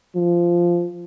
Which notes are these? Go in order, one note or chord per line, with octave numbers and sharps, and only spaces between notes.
F3